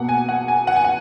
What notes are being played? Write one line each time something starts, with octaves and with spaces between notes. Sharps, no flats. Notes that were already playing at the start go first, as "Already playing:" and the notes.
Already playing: B2 A#3 F#5
G#5
F#5
G#5
F#5
G#5
F#5